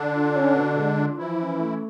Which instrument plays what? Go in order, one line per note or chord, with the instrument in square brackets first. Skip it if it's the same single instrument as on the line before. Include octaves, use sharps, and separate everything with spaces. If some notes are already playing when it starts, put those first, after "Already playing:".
Already playing: [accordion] D3 D4
[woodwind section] F4
C#4
B2
G#3
F4
[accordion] E3 E4 [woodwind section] F3
[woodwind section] C#4
A3